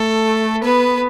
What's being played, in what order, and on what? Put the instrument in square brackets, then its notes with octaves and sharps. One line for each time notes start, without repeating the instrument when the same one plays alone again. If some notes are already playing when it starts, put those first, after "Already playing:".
Already playing: [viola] A3 [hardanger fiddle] A4
[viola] B3 [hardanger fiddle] B4